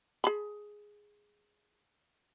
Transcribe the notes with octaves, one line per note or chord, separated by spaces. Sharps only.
G#4 B5